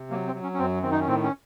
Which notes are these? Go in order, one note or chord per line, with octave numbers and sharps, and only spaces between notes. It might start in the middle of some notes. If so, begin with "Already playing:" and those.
Already playing: C3
F#3 A#3
C4
F#3
C#4
C#4
F#2 C4
D#3 C4
D#4
C#4
A2 C4
C#4